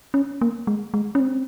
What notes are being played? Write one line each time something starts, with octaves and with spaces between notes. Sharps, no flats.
C#4
A#3
G#3
G#3
C#4
C4